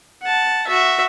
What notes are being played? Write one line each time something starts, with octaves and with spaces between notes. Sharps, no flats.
F#5 A5
F#4 E5